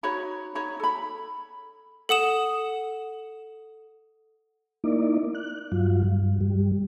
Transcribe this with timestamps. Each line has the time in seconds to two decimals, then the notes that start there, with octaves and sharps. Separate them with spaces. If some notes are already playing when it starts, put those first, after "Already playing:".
0.03 D#4 F#4 C#5 B5
0.55 D#4 C#5 B5
0.80 A4 B5
2.09 A4 F#5 D#6 E7
4.84 A#3 D#4 E4 D5
5.35 F#6
5.72 G2 F#3 F4
6.04 G2
6.41 G2 G3